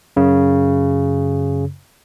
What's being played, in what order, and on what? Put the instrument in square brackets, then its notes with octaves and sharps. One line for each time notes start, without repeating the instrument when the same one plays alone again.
[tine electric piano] F#2 C#3